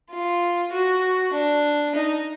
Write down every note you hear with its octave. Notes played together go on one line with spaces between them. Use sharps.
F4
F#4
D4
D#4